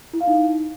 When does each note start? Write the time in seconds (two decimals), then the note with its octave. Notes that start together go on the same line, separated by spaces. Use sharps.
0.13 E4
0.21 F5
0.28 D#4